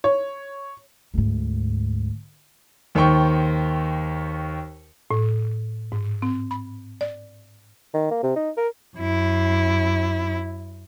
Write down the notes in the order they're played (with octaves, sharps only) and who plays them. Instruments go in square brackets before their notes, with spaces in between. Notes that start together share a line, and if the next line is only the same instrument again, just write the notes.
[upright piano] C#5
[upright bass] D2 G#2
[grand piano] D#2 D#3 C5 G5 C#6
[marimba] A2
G#2
C4
B5
D5
[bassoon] D#3
A#3
C3
D#4
A#4
[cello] F#2 E4